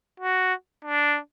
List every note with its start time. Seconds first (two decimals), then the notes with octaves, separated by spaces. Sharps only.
0.20 F#4
0.85 D4